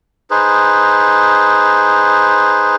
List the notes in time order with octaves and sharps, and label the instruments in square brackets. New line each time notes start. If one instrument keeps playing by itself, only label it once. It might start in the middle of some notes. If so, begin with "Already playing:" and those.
[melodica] D#4 G#4 B4 C5